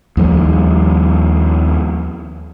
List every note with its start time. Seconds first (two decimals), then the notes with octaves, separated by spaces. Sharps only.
0.17 D#2 F3 G3